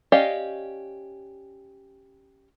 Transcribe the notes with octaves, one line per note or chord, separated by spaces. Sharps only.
C#4 G4 D5 D#5 F5